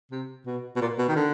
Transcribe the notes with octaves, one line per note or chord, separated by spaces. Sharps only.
C3
B2
B2
A#2
B2
D#3
D3